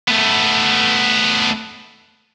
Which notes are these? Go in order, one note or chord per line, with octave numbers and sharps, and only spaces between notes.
A3 B3